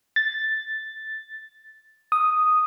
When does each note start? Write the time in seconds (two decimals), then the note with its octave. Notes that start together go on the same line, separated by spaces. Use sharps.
0.16 A6
2.12 D#6